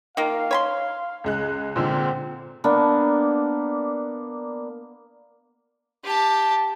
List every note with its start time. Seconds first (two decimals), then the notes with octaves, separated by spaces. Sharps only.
0.17 D#3 A#3 F4 F5
0.51 C#5 B5 C6
1.24 C#2 G#3 F#6
1.76 A#2 D3 G#3 C4
2.64 A#3 B3 D4
6.04 G4 A5